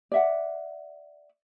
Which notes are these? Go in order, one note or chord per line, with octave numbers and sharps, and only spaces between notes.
D5 E5 F#5